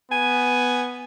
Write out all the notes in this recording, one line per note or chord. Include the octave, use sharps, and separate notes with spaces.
B3 G#5